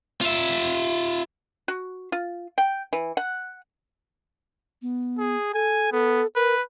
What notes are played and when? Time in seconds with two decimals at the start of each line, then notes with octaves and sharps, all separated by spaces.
0.21 F4 E5
1.68 F#4
2.12 F4
2.58 G5
2.93 E3
3.17 F#5
4.82 B3
5.18 G#4
5.54 A4 G#5
5.92 B3 A4
6.35 A#4 B4